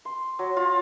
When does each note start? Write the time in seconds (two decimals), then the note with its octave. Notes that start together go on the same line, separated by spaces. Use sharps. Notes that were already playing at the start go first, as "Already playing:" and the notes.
0.05 C6
0.39 F#3
0.57 F4